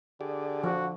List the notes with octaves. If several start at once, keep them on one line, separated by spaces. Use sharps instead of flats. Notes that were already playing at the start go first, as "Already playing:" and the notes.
D3 G4 G#4 D5
F3 F#4